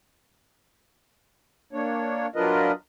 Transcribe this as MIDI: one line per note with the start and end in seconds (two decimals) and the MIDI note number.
1.73 2.27 58
1.73 2.27 62
1.73 2.27 73
2.36 2.72 54
2.36 2.72 62
2.36 2.72 65
2.36 2.72 70
2.36 2.72 71
2.36 2.72 75